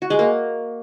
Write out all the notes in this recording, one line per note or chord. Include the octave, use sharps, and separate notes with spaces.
F#4
G#3
A#3